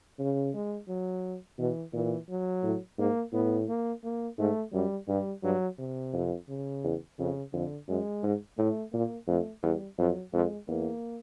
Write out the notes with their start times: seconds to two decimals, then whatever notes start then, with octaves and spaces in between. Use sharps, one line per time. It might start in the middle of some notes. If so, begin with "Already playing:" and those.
0.19 C#3
0.54 G#3
0.88 F#3
1.58 B2 E3
1.93 A#2 E3
2.29 F#3
2.63 A2
2.98 G#2 A#3
3.33 A2 B3
3.68 A#3
4.04 A#3
4.38 G#2 A3
4.73 F#2 G3
5.08 G2 G3
5.43 G2 F#3
5.78 C3
6.13 F2
6.49 C#3
6.84 E2
7.18 F2 C#3
7.53 F2 D3
7.88 F#2 G#3
8.23 G#2
8.58 A2 A3
8.93 A#2 A#3
9.28 F2 A3
9.63 E2 G3
9.98 F2 F#3
10.33 F2 G#3
10.68 E2 A#3